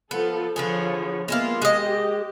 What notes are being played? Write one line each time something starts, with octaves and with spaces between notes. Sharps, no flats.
F3 B3 A4
D3 F3 B3 G#4 C#5
G#3 A#3 B3 E4 F4
G#3 G4 D#5